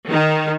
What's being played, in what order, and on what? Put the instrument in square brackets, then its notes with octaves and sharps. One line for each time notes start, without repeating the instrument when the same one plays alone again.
[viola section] D#3